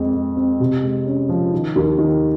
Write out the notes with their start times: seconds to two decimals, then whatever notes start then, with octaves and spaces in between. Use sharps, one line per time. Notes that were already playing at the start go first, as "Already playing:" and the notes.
Already playing: F2 G#3 C4
0.14 G#3
0.36 C4
0.60 C3
0.83 G#3
1.06 C#4
1.29 F3
1.53 D#3
1.76 D#2
1.98 D#3